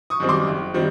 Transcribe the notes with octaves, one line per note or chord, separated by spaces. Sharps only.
C#6 D#6
F#2 D#3 G3 C4
C6 D6
F#1
D#3 G3 C4